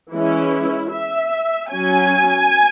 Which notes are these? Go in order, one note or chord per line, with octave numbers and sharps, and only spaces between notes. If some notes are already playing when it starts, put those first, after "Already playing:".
E3 G#3 C#4 E4
E5
F#3 C#4 G#5